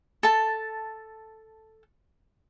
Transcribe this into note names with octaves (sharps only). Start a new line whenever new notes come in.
A4 A5